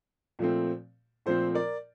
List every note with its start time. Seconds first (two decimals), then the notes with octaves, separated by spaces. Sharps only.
0.39 A#2 F3 A3 C4
1.26 A#2 F3 A3 C4 A4 C5
1.54 A#4 D5